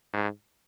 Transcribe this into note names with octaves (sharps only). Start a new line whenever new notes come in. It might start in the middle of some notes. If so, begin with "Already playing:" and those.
G#2